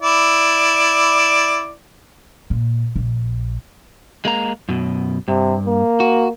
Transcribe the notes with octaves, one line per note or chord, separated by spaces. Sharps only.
E4 D5
A#2
A#1
G#3 A#3 A#5
F#2 B2
G2 C3
A#3
F#4